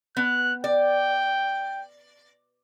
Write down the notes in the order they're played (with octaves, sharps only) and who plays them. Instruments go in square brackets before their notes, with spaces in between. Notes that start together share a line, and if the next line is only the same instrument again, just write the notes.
[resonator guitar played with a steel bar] B3 [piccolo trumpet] F#6
[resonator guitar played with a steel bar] D5 [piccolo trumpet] G5